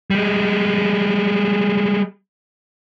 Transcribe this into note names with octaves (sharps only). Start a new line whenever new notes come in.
G3 G#3